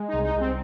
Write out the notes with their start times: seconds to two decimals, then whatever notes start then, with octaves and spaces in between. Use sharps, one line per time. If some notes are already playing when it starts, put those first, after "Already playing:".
Already playing: G#3
0.08 C2 D#4
0.24 D#4
0.35 C2 C4